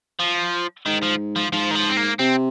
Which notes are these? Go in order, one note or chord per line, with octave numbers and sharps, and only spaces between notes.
F3
G#2 D#3
F3
F3
G#2 F3
D#3
F3
C4
A#3
C3 C4